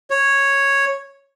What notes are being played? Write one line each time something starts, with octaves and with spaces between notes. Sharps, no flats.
C#5